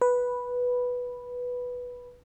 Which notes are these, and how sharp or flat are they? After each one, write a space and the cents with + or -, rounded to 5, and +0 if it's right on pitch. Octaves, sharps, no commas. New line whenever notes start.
B4 -5